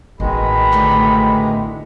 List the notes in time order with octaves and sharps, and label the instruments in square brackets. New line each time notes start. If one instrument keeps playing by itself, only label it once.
[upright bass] A1 [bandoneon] B2 D#3 G#3 [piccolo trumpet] B5
[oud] D2 A2 D3